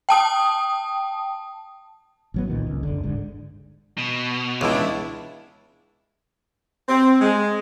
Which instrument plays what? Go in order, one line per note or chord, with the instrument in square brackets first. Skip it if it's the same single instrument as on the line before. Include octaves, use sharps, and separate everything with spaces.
[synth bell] G5 A5 D#6
[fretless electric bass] A1 F#3 B3
C2 A#2 D#3
C#2
F#1 D3
G#2 D3
[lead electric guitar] B2
[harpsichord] C#2 [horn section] D4 E4
[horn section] C4
G#3